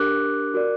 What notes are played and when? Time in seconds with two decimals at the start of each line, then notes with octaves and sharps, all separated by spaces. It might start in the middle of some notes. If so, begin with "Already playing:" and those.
Already playing: D4 G4 A#4 D6 F#6
0.54 F#4 A#4 D5